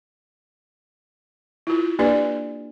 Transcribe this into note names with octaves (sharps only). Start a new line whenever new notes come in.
E4 F4
A#3 D4 G4 B4 D5